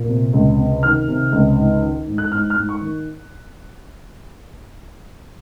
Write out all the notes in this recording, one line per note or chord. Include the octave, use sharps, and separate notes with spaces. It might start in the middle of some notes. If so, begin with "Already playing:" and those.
Already playing: A#2
C3
C#2
C3
D#3 F6
C3
C#2
G#2
D#3
G#2
F#6
G#2 F6
F6
G#2
C#6
D#3